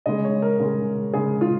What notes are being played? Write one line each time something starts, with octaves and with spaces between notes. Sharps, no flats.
C#3 G#3 D#5
C#5
A#4
C#3 G#3
C#3 G#3 G#4
F4